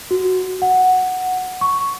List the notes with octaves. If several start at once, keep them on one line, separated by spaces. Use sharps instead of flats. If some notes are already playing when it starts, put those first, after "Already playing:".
F#4
F#5
C#6